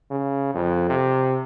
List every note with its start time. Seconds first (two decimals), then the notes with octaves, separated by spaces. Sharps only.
0.11 C#3
0.54 F2
0.89 C3